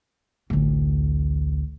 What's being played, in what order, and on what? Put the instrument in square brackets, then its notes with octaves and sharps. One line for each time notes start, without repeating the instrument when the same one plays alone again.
[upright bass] A1 D2